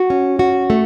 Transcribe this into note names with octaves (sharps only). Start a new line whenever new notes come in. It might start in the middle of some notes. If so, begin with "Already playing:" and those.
Already playing: F#4
C#4
F#4
A3